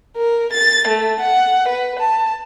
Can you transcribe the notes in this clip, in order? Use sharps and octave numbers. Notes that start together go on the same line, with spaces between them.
A#4
A6
A3
F#5
B4
A5